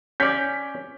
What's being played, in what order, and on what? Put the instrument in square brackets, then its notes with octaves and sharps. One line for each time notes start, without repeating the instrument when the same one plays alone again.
[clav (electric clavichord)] C#4 D5 [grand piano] G6 B6